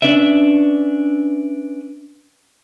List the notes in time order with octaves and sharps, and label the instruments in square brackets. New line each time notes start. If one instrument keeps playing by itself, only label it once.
[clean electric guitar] C#4 D4 B4 D5 E5